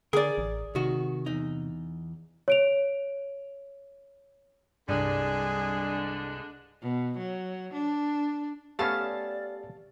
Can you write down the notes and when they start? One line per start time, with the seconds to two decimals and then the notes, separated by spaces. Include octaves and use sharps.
0.13 D3 G#4 A#4 D5
0.38 A1
0.75 C3 D#3 F#4
1.26 E2 D#4
2.48 C#5 D7 F7
4.88 C2 G2 D3 G#3 D4 G#4 D5 D#7
6.82 B2
7.18 F#3
7.73 D4
8.79 A3 B3 C#4 G4 D5 F5 A5 F6